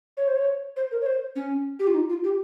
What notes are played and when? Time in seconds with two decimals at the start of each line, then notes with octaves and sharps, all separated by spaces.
0.17 C#5
0.28 C5
0.36 C#5
0.76 C5
0.91 A#4
1.01 C#5
1.06 C5
1.36 C#4
1.79 G4
1.87 F4
1.94 D#4
2.09 F4
2.24 G4